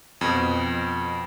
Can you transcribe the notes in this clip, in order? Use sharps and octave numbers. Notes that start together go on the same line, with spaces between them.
F2 B2